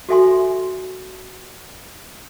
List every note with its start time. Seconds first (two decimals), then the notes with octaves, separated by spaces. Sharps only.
0.09 F#4 A4 E5 G#5 C6